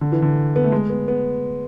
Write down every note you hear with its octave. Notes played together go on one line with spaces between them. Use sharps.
D3
E3
D3
B3
A3
G#3
B3
B3